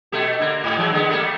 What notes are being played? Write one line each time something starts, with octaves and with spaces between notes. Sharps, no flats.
B2 A3 G4
D3 A#3
G#2
E3 F#3 G#3
D3 G#3 B3
G3 A3 A#3